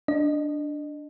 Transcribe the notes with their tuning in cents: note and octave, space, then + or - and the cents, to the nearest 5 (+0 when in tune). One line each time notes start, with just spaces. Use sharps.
D4 +0 D#5 -25